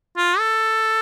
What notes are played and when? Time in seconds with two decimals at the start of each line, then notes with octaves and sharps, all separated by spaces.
0.17 F4
0.39 A4